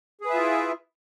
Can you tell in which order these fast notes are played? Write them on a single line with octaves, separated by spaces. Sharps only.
G#4 B4 E5 F4 E4